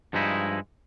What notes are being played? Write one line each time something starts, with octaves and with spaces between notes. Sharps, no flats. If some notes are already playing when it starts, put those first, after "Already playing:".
G2 F3 G#3 D#4 E4